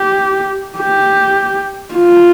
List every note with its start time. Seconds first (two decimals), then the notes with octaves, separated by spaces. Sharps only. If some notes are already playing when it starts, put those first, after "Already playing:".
Already playing: G4
0.78 G4
1.94 F4